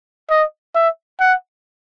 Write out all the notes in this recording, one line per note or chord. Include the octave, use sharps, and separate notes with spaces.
D#5
E5
F#5